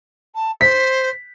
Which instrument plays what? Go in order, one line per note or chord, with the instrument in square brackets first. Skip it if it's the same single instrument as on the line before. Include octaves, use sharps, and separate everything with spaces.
[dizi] A5
[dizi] C5 [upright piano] B6